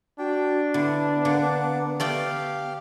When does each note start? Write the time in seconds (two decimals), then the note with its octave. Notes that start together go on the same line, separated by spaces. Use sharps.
0.19 D4 F#4 G5
0.74 D3 B3 E4
1.25 D3 A#3 F#5 D6
2.00 A3 G4 D5 F5 G5